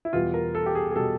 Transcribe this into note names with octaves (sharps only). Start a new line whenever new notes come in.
E4
E2 B2 G3 F4
A#4
A4
G4
G#4
G#4
B2 G3 A4